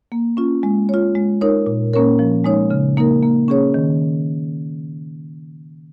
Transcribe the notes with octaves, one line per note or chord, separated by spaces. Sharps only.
A#3
C#4 F4
G#3
F4 C#5
G#3
D#4 A#4 C#5
A#2
A#3 C#4 A#4 C#5
F3
G#3 D#4 C#5
C#3
A#3 D#4 A#4
A#3
C#4 G#4 C#5
D#3